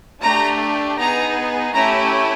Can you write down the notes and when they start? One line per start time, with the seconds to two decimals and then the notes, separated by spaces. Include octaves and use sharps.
0.23 A3 D4 G4 A#5
0.98 B3 D#4 G#4 A#5
1.73 A3 C#4 E4 G4 A#5